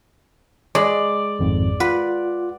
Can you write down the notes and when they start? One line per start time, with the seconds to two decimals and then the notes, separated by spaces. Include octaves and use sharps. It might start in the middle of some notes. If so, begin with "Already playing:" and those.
0.75 G#3 D5
1.39 G#1 F2 G#2
1.80 F4 B4 F#5